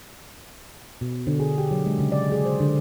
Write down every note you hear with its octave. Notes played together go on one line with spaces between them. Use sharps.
B2
D3
G#4
G4
F#3
G#3
C#3
D5
G#4
C5
D3